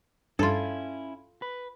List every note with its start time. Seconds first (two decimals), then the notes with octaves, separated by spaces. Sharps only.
0.39 G2 C#4 E4 F4 A4
1.42 B4